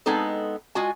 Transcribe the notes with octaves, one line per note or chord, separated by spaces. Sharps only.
G#3 B3 C4 D#4 A4
G#3 F4 F#4 G#5